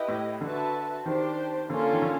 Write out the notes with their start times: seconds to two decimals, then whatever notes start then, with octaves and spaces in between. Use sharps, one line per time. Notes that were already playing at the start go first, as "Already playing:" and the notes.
Already playing: E4 G4 B4 D#5
0.08 A2
0.41 D3 F#4 B4 E5 A5
1.05 D#3 D4 G4 C5
1.69 D3 A#3 C#4 F4 A4
1.93 D#3
2.02 D3